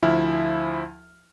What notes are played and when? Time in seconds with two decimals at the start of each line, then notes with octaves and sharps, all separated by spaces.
0.02 D2 F3 E4 E5 G#5 F6